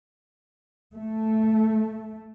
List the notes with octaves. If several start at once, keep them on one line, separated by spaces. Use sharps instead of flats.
A3